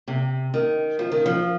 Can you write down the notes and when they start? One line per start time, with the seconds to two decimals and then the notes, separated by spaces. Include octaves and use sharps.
0.08 C3
0.54 D#3
0.99 F3
1.12 D#3
1.26 F3